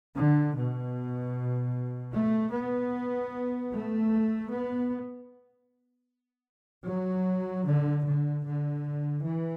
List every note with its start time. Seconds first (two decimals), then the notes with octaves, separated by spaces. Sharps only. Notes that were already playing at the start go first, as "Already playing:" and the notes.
0.16 D3
0.55 B2
2.13 A3
2.52 B3
3.72 A3
4.50 B3
6.87 F#3
7.66 D3
8.06 D3
8.45 D3
9.24 E3